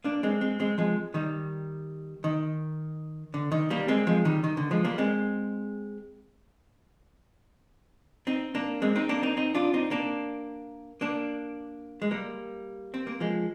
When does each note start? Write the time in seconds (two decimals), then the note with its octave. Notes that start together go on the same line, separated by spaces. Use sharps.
0.04 A#3 D4
0.23 G#3 C4
0.41 G#3 C4
0.60 G#3 C4
0.78 F3 G#3
1.14 D#3 G3
2.24 D#3
3.34 D3
3.52 D#3
3.70 G3 A#3
3.88 G#3 C4
4.07 F3 G#3
4.25 D#3 G3
4.44 D#3
4.57 D3
4.71 F3 G#3
4.85 G3 A#3
4.98 G#3 C4
8.27 C4 D#4
8.55 A#3 D4
8.82 G#3 C4
8.96 C4 D#4
9.09 A#3 D4
9.23 C4 D#4
9.37 C4 D#4
9.55 D4 F4
9.74 C4 D#4
9.91 A#3 D4
11.01 A#3 D4
12.02 G#3
12.11 G3 A#3
12.94 C4
13.07 A#3
13.20 F3 G#3